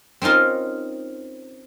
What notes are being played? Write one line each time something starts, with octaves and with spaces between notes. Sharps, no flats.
C4 C#4 D#4 F4 A#4